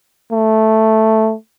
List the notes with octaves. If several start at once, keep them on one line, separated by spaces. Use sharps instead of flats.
A3